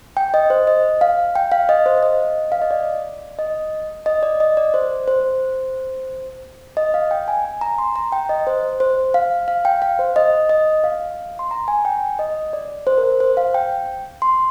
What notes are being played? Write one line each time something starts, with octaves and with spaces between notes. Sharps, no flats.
G5
D#5
C5
D#5
F5
G5
F5
D#5
C5
F5
D#5
F5
D#5
D5
D#5
D#5
D5
D#5
D5
C5
C5
D#5
F5
G5
G#5
G#5
A#5
C6
A#5
G5
D#5
C5
C5
F5
F5
G5
F5
C5
D#5
D#5
F5
C6
A#5
G#5
G5
D#5
D5
C5
A#4
C5
C5
F5
G5
C6